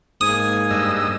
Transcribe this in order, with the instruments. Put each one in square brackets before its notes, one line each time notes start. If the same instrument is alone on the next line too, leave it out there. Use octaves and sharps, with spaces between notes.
[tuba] G#2 [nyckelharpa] A#3 G#5 [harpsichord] D#6
[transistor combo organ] G2 D#5 E6